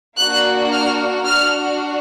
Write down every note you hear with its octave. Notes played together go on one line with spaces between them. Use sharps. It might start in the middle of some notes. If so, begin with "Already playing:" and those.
A#3 D4 F#4 F#6
F6
D4 F#4 F6